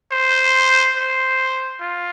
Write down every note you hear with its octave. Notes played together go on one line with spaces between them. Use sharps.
C5
C5
F4